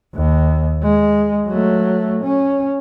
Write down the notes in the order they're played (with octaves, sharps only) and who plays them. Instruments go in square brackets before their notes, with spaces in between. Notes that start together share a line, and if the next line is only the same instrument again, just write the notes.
[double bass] D#2
G#3
F#3 A3
C#4